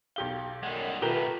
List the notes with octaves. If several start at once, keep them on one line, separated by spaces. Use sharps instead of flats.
B1 G4 F5 G7
F#2 G3 G#3 F#5
B2 D#3 A3 F4 G4 A#4 B4 G7